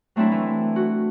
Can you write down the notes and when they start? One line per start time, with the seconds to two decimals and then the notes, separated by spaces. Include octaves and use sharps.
0.16 F#3 A3 C4 D4 E4
0.32 E3
0.76 F#4